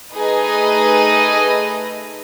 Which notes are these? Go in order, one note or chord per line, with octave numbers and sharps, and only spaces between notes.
A3 D#4 G#4 B4 D#5